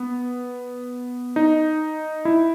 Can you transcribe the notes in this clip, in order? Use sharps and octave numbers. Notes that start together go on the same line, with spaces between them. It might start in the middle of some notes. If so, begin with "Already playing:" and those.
Already playing: B3
D#4
E4